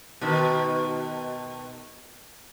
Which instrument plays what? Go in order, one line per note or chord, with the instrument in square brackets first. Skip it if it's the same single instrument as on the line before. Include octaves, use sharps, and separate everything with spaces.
[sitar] B2 D#3